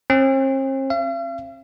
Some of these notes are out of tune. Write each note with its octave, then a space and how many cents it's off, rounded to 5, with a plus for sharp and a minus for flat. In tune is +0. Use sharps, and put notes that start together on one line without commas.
C4 +45
F5 -45